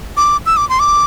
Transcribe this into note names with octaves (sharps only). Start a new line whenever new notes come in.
D6
E6
D6
C6
D6